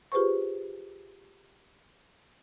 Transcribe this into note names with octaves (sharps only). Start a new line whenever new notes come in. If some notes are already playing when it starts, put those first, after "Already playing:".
F4 G4 G#4 B4 C5 C#6